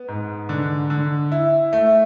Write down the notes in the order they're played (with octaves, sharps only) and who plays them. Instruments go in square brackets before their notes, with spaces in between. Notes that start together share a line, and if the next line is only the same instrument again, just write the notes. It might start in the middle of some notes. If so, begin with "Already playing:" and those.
Already playing: [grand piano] B3
G#2
D3
D3
E4
A3